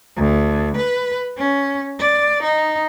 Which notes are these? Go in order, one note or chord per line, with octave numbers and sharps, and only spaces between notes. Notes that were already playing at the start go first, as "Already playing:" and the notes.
D2
B4
C#4
D5
D#4